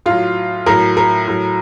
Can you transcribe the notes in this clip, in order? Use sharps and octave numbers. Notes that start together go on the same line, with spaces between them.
A2 F#3 F4
A2 F#3 A#4
A#4
A2 F#3